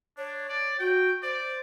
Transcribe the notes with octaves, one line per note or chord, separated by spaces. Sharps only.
D4 C#5
D5
F#4 G5
C5 D5